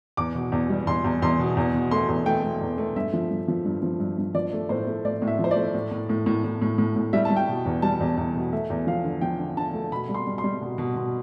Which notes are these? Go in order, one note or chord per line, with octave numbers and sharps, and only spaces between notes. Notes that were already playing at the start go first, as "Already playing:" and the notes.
E2 D6
B2
E2
G3
E2 C6
E2
E2 C6
B2
E2
B2
A3 C6
E2
A3 G5
A3
E2
A3
G2 E5
F3
G2
F3
G2
F3
G2
G2
F3 D5
A3
A2 C5
A3
A2 D5
A2
E5
F3
C5
D5
A3
A2
A2
A2
A2
A2
A2
A2
A2
G3 E5
A5
G3
G5
B2
E2
G3 A5
E2
E2
B2
A3 E5
E2
F3 F5
D3
F3 G5
D3
D3 A5
A3
B2 B5
G3
C6
G3
C6
G3
B2
B2
B2